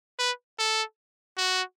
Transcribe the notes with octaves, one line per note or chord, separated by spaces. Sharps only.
B4
A4
F#4